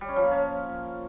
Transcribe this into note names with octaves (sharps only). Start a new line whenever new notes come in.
G3
C#4
F3
A#3
C#4